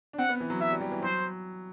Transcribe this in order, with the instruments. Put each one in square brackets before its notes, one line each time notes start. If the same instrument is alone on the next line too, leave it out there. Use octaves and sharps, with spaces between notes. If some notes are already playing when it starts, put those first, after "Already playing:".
[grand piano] D4
[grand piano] C4 [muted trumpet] F#5
[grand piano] B3
E3
F#3
[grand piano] F#3 [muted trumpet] E5
[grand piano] G3
G3
E3
[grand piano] F#3 [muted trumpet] C5